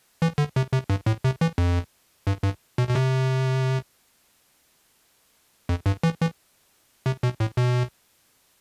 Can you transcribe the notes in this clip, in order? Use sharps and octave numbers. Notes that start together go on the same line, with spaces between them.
E3
D3
C3
C3
G2
A2
C3
E3
F2
G2
G2
B2
B2
C3
F2
G2
E3
E3
C3
B2
A2
B2